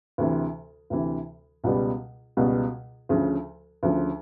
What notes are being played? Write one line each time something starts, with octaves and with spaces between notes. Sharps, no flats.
D2 C3 E3
D2 C3 E3
C#2 B2 G3 B3
C#2 B2 G3 B3
D2 C#3 F3
D2 C#3 F3